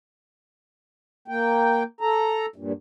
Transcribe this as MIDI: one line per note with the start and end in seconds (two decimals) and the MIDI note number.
1.28 1.83 58
1.28 1.83 79
2.01 2.46 69
2.01 2.46 82
2.56 2.72 43
2.56 2.72 46